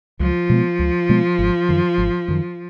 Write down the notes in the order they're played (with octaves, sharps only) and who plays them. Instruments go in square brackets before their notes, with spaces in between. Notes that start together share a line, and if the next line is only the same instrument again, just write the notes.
[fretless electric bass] C#2 [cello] F3
[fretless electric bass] B2 G#3 B3
C#2
B2 G#3 B3
G#1
F#2 D#3
G#1
F#2 D#3